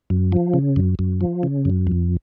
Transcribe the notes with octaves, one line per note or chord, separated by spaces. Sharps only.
F#2
F3
C#3
F#2
F#2
F3
C#3
F#2
F2